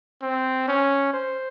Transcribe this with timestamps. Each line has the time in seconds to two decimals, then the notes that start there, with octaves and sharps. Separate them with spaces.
0.22 C4
0.68 C#4
1.13 C5